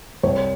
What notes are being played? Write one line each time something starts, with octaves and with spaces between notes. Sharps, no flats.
C2 C#5